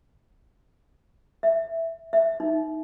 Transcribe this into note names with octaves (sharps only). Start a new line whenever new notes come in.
E5
E5
D#4